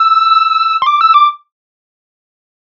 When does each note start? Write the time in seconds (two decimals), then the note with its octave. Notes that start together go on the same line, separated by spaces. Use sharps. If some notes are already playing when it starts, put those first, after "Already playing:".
Already playing: E6
0.82 C6
0.86 D6
1.01 E6
1.14 D6